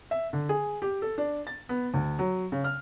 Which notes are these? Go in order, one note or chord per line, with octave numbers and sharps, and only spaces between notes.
E5
D3
G#4
G4
A4
D4
A6
B3
D2
F#3
C#3
F6